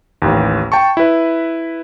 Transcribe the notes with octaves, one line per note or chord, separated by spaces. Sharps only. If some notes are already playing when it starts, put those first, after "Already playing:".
A1 D#2
G5 A5 C#6
E4 B4